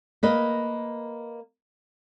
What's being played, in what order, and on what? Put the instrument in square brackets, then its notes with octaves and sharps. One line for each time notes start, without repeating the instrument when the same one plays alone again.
[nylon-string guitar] A#3 B4 D#5